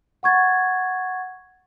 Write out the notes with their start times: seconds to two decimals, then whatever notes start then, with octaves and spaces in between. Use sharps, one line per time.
0.23 F#5 C#6 G#6 A6